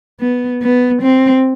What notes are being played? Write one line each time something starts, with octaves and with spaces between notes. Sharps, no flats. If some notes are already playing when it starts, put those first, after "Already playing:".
B3
B3
C4